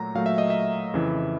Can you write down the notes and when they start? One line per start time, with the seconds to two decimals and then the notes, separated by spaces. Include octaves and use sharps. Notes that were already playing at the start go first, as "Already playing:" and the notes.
Already playing: A#2 F#3 A3 A#5
0.15 A#2 F#3 A3 F5
0.26 E5
0.38 D#5
0.50 E5
0.94 F2 C#3 E3